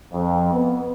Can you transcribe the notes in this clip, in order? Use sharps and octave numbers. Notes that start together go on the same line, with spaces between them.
F2
B3